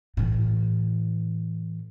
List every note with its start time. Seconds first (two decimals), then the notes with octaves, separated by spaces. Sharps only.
0.17 A2 E3